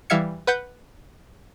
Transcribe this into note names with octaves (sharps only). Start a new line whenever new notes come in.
E3 G3 E5 F5 G#6 C#7
B4 F#5 G6